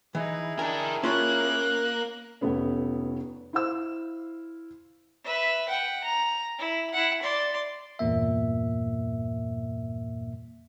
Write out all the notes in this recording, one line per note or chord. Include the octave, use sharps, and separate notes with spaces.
E3 D#4 E4 G#4
D4 A#4 G5 G#5
A#3 C#4 F4 C#5 F#6
F1 A3 B3 C#4
E4 C5 F5 E6
B4 E5
F#5 G5
A#5
E4
E4 F#5
D5 C6
E2 G2 A#2 A#3 E5